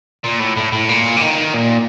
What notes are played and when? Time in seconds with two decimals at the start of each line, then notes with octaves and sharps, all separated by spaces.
0.24 A#2
0.39 A2
0.57 A2
0.72 A2
0.89 A#2
1.16 D3
1.21 D#3
1.54 A#2